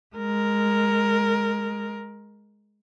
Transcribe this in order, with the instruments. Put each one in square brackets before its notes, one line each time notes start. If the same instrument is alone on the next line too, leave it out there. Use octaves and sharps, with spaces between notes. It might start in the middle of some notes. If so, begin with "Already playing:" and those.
[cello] G#3 A#4